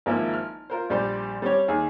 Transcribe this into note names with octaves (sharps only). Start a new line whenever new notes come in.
G#1 F3 A#3 E4
F6
F4 A#4 C5
A#1 G3 C5 D5 C6
G3 C4 C#4 G4 C#5
D#2 G#4 G#5